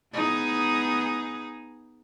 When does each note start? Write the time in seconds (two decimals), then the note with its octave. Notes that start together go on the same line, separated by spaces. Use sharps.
0.13 B3 D#4 G#4